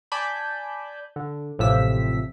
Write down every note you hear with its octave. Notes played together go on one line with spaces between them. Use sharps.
D5 G#5 A5 B5 G6
D3
A1 A2 C3 F3 E6 B6